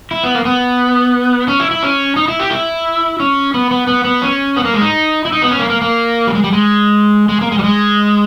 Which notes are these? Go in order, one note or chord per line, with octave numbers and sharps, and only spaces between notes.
E4
B3
A#3
B3
C#4
E4
E4
C#4
D#4
E4
G4
E4
C#4
B3
B3
B3
B3
C#4
B3
A#3
G#3
D#4
E4
D#4
B3
C#4
A#3
A#3
A#3
G3
G#3
G3
G#3
G#3
A#3
G#3
G3
G#3